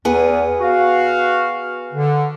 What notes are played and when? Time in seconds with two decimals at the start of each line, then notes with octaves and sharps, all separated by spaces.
0.05 E2 B3 G#4 B4
0.61 F#4 F5
1.93 D3